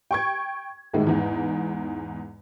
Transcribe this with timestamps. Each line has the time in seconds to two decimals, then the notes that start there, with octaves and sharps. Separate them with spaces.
0.11 G5 C#6 G#6
0.94 G#1 A2 D#3 G#3
1.07 E2 G#2